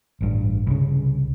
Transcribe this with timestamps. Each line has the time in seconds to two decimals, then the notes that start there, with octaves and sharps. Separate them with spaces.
0.21 A1 G2
0.67 C2 C#3